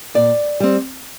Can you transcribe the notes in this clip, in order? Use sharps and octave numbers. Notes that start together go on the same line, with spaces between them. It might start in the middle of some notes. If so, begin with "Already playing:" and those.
A#2 D5
G3 C4